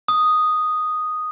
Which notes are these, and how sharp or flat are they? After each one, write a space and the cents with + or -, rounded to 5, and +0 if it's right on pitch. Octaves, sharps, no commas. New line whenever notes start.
D#6 -5